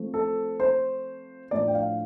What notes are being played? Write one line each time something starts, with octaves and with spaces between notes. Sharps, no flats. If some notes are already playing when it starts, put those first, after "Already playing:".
Already playing: F3 A3 C4
A4
C5
A2 F3 D4 D5
G5
F5